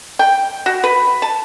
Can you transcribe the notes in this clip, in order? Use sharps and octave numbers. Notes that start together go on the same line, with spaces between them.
G5
F#4
B4
A5